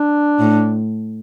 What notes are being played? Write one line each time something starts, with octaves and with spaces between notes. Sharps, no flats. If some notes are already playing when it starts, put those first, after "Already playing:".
Already playing: D4
A2